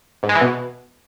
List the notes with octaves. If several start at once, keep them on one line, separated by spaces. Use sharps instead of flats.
G#2
G#3
E3
B2